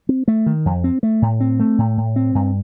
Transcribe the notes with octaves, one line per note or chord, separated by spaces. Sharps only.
C4
A3
D#3
F2
C4
A3
A2
C4
A3
A2
A2
C4
G2